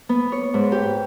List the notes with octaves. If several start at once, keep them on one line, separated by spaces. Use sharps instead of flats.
B3
C#5
G#2
G4